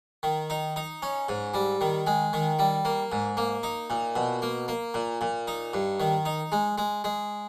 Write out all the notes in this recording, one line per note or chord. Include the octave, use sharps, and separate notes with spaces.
D#3
D#4
D#4
C#4
G#2
G3
D#3
G#3
D#3
G3
A#3
G#2
A#3
D#4
A#2
B2
A#3
A#3
A#2
A#2
D#4
G2
D#3
D#4
G#3
G#3
G#3